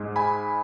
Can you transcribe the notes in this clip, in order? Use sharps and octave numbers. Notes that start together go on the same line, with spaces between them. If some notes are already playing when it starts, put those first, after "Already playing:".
Already playing: G#2 G#3
G#5 B5